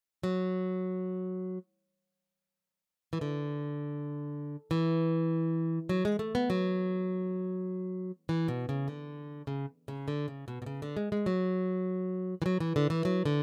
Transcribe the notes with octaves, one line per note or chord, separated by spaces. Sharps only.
F#3
E3
D3
E3
F#3
G#3
A3
B3
F#3
E3
B2
C#3
D3
C#3
C#3
D3
C#3
B2
B2
C#3
D3
G#3
G#3
F#3
E3
F#3
E3
D3
E3
F#3
D3